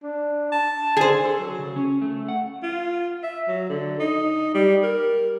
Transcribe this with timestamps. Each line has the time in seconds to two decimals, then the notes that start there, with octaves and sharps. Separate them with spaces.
0.03 D4
0.52 A5
0.97 D3 G#4 C5
1.25 A4
1.39 F#3
1.59 C#3
1.76 C#4
2.02 A3
2.28 F#5
2.63 F4
3.23 E5
3.48 F#3
3.69 D3
4.00 D#4
4.54 G3
4.83 A#4